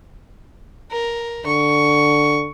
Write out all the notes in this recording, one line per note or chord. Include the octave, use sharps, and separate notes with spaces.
A#4
D3 C#6